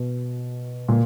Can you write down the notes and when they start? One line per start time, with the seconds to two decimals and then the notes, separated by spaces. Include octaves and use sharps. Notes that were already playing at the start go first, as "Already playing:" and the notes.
Already playing: B2
0.88 A#2